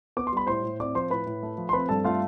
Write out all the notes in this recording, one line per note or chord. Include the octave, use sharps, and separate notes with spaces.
B3 D6
C6
G3 B5
A2 C5 C6
A2
C4 D5 D6
F3 C5 C6
A2 B4 B5
A2
A3
F3
C6
C4 B4 B5
G2 A4 A5
A3 F4 F5